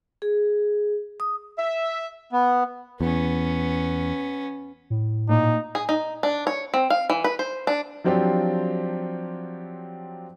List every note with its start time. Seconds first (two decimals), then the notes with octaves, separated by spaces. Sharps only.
0.22 G#4
1.20 D#6
1.58 E5
2.32 B3
3.01 E2 B3 C#4
4.90 A2
5.29 A#2 D#4
5.75 G#4
5.89 D#4
6.23 D4
6.47 C#5
6.74 C4
6.90 F5
7.10 E3
7.24 B4
7.39 C5
7.67 D4
8.04 F3 F#3 C4 D4 F4 G4